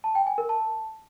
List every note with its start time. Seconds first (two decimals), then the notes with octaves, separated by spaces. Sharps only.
0.04 A5
0.15 G5
0.27 G#5
0.38 A#4
0.49 A5